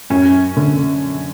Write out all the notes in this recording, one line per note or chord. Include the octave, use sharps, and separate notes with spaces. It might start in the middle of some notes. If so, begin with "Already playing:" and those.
F#2 C#4
D3